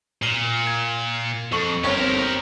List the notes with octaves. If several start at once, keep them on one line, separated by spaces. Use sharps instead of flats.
A#2 C7 D#7 G7
G#6
F2 A4 C#6 F#7
G1 C4 G4 A#4 C#5